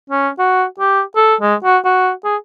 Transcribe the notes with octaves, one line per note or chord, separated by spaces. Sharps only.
C#4
F#4
G4
A4
G#3
F#4
F#4
G#4